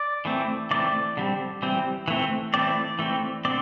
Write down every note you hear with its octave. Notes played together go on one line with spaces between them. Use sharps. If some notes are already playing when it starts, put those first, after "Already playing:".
Already playing: D5
E3 A3 C4
E3 A3 C4 D5
D3 G3 C4
E3 G3 C4
E3 A3 C4
E3 A3 C4 D5
E3 A3 C4
D3 C4 D5